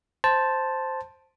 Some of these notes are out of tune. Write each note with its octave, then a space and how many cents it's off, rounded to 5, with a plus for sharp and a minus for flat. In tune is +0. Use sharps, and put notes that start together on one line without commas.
C5 +0 A5 +0